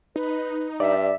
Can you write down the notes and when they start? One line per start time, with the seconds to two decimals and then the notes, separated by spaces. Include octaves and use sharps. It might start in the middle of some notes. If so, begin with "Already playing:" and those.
0.16 D#4 B4
0.80 G2 D5 E5